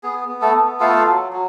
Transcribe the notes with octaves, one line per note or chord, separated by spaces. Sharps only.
B3 G#4
B3
A3 A4
B3
A3 F4 A4
F#3
F#3